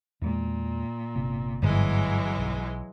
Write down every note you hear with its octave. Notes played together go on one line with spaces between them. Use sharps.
E2 A#2 G#3
G1 C3
G1 G#2 E3 F#3 G#3
B1